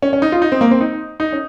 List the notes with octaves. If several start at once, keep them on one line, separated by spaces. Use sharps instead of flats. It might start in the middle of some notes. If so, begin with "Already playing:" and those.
C#4
C#4
D#4
F4
D#4
C4
A#3
C4
D#4
D#4
C#4